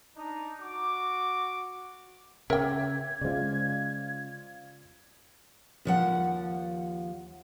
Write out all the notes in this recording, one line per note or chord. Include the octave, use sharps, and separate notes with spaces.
D4 D#4
F#4 D6
C#3 A#4 E5 G5 D6 G#6
C#3 G#3 F4 C5 D5
D#2 F3 F#5